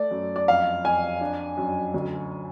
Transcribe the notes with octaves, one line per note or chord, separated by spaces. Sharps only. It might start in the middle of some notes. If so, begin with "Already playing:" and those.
Already playing: A3 D5
F#2
D5
F2 F5
F2 G#5
D4
F#2
D2